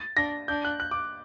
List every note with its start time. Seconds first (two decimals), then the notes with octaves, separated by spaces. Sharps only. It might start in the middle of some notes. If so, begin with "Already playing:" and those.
Already playing: A6
0.17 D4 A#6
0.48 D4 G6
0.65 F#6
0.80 F#6
0.91 D6